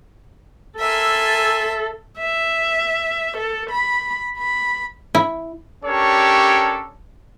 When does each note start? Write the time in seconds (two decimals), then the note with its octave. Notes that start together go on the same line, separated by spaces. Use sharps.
0.79 A4 A#4 E5 G#5 C6 E6
2.18 E5
3.38 A4
3.71 B5
4.38 B5
5.15 E4
5.85 C#4 D4 G4 A4 A#4 C#5